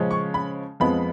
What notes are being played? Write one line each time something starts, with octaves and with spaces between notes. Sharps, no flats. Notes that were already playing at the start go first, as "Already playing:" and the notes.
Already playing: C#3 F3 G#3 C#4
C#6
B5
F2 F3 G#3 B3 B5